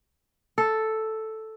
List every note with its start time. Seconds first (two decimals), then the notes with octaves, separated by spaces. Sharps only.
0.58 A4